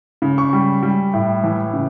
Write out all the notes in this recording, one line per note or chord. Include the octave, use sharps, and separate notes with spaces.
C#3
C#6
G3
G3
A2
E3
C#3